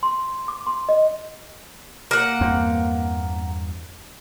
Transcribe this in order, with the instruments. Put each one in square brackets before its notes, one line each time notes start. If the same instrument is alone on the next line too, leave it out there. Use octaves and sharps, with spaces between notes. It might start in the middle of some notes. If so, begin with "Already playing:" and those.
[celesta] C6
D6
C6
D#5
[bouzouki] A#3 F#5
[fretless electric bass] E2 G2 C4